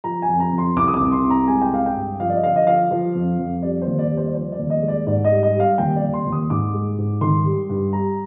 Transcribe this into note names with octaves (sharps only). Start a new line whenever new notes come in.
F3 A#5
G#5
F2
A#5
F2
C6
C2 D6
D#6
D6
C2
C6
C2
A#5
G#3 G#5
G5
G#3 F5
G5
G2
F3 F5
D5
D#5
D3 F5
D#5
F3 F5
F3
F2
F2
G3 D5
C5
D#2
D5
G3
C5
D5
F3 C5
D5
D#2
D#5
G#3
D5
G#2 D5
D#5
G3
D#5
G3 F5
D#2 G5
D5
D#2
C6
D#2
D#6
G#2 D6
G#3
G#2
D#3 C6
G3
G2
G3 A#5